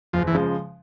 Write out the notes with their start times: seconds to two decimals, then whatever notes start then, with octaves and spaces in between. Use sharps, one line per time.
0.13 F#1 F3
0.27 E3
0.35 C#3 F3 G#3